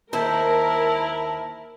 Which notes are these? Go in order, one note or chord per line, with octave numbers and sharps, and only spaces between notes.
D#2 E4 A#4 C5 A5 A#5